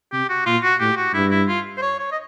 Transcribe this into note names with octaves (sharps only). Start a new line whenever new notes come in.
C3 G4
F#4
A#2 F4
F#4
A2 G4
F#4
G2 E4
E4
F4
C5
C#5
C#5
D#5